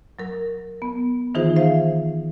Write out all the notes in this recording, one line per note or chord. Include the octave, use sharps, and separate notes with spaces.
F#3 A#4
B3
D#3 E3 D#4 F4 G#4 C5
C5 E5 F5